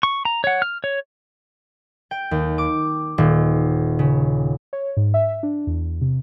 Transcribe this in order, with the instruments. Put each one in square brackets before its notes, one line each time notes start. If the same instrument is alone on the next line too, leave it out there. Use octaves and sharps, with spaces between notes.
[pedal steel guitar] C#6
A#5
C#5 F#5
F6
C#5
[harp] G5
D#2
D6
D#1
C#3
[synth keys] C#5
G#2
E5
D4
E2
C3